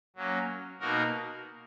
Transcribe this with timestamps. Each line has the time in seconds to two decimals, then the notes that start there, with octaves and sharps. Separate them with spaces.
0.16 F#3 A#3 C#4
0.80 B2 A#3 D#4 F#4 A#4